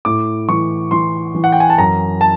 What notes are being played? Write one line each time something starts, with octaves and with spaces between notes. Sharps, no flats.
A2 D6
E3 C#6
E3 C6
E3
F#5
G5
G#5
A5
F#2 A#5
A5